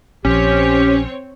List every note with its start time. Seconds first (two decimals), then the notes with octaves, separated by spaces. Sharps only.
0.25 A#1 F3 C4 C#4 G4 C#5